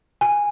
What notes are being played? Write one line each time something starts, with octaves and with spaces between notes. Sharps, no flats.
G#5